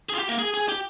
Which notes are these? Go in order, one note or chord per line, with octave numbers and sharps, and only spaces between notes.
G#4
F4
G4
A#3
G#4
G#4
G4